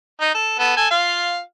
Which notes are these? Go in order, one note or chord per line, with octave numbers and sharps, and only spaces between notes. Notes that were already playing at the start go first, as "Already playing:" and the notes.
D#4
A4
B3 A4
A4 G#5
F4 F5